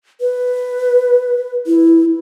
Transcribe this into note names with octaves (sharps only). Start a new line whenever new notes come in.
B4
E4